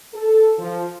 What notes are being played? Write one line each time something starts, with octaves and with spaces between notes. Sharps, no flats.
A4
F3